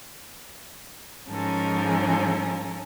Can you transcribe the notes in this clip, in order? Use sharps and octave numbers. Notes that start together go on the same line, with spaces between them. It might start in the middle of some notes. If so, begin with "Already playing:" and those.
G#2 F3 C#4 A4 A#4 G#5